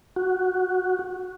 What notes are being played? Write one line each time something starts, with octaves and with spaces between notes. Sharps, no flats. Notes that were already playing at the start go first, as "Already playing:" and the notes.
F#4